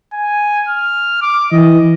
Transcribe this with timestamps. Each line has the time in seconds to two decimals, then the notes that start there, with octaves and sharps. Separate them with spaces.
0.13 G#5
0.69 F6
1.22 D6
1.52 E3 D#5